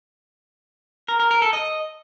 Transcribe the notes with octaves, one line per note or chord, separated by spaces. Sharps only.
A#4
A#4
A#4
A4
D#5